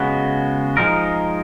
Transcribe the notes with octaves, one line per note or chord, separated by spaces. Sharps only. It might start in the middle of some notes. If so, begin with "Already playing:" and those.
Already playing: C#3 G#3 B3 F#4
F3 G#3 D#4 A#4